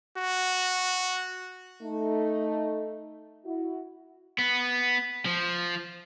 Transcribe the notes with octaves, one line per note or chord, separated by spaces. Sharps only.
F#4
A3 D#4
E4 F#4
B3
F3